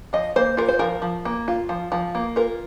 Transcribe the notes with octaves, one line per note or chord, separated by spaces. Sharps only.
F3 D#5
A#3 C5
F4 A#4
C5
F3 A#4
F3
A#3
F4
F3
F3
A#3
F4 A#4